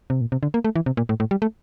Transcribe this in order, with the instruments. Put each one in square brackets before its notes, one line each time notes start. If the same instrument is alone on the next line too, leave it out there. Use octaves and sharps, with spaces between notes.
[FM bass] C3
A#2
C3
D3
A#3
A3
E3
C3
A#2
A2
A2
G3
A3